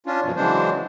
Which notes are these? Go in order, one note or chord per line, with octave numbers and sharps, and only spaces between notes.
C#4 D4 F4
F#2 B2 F3
C#3 E3 F#3 G#3 D4 C5